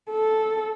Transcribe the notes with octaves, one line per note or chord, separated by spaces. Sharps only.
A4